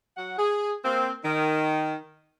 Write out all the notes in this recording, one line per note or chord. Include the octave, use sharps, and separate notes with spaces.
F#3 F#4 F#5
G#4
A#3 C4
D#3